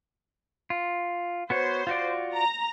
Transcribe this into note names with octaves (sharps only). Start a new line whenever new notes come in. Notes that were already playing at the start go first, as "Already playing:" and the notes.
F4
B3 F#4 C5 C#5
F4 F#4 D5
A#5